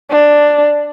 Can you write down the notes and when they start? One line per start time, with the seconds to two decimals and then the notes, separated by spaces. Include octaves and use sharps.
0.11 D4